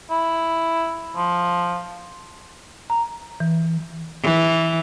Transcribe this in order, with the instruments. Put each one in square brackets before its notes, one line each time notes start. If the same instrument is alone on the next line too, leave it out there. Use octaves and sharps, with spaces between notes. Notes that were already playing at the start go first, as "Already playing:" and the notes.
[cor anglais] E4
F3
[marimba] A#5
E3
[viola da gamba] E3